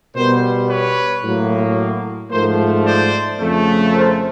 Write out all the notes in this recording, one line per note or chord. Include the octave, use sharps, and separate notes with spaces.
B2 G3 B3 A#4 C5
B4 C#5
A2 F#3 A#3
G#2 F3 A3 A#4 C5
C5 D5
F2 C#3 F3 A3
A#4 C5